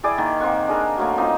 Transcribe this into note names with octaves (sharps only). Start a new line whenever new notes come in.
E4 G#4 D5 G5
D#3 A#3
A#3 C4 F#5 C#6
D4 G#4 A#4
F#3 A3 A#3
A#3 C4 D#4 F4